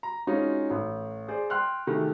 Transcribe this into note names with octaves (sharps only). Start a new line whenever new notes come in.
A#5
G#3 C4 C#4 D#4 F4 F#4
A1
G#4 C5 D5
G5 C6 F6 F#6
C3 D#3 A3 F#4 G#4